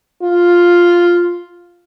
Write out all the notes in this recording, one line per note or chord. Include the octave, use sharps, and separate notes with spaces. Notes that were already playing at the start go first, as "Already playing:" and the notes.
F4